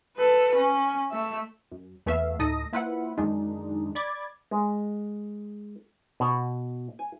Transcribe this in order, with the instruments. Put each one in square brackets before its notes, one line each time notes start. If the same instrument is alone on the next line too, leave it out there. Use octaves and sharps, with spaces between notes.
[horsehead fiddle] A4 B4
C#4
A3 E5
[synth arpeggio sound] F#2
E2 A3 B3 E5 F5
D2 A2 D#4 A4 D#6 A#6
A#3 E4 F4 B4 C5 F#5
F#2 D3 D#3 G#3 D4 D#4
D5 B5 D6 G#6 A6
[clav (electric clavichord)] G#3
B2
G#5